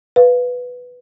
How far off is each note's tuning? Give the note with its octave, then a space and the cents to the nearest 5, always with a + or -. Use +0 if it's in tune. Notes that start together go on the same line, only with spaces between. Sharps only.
B4 +0 F5 +0